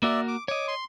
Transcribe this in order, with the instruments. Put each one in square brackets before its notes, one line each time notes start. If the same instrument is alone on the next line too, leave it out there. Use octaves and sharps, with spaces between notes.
[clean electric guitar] A#3 F#4 A#4 [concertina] D5 E5
[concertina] D6
[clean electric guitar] C#5 D#5 [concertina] D6
[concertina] C6